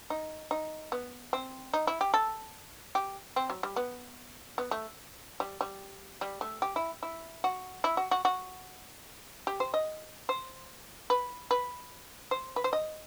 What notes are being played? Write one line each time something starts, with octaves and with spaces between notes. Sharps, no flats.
D#4
D#4
B3
C4
D#4
E4
G4
A4
G4
C4
F#3
G3
B3
B3
A3
G3
G3
G3
A3
G4
E4
E4
F#4
E4
F#4
F#4
F#4
G4
C5
D#5
C5
B4
B4
C5
B4
C5
D#5